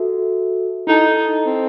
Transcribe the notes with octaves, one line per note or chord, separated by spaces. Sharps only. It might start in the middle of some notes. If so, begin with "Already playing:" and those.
Already playing: F#4 A4 E5
D#4 E4 A4 D#5 A5
C4